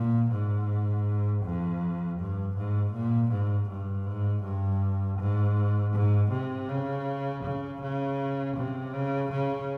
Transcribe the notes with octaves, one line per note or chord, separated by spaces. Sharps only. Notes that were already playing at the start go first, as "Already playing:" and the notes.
Already playing: A#2
G#2
F2
G2
G#2
A#2
G#2
G2
G#2
G2
G#2
G#2
C3
C#3
C#3
C#3
C3
C#3
C#3